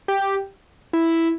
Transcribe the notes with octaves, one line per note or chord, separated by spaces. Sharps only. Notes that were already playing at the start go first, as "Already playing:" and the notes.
G4
E4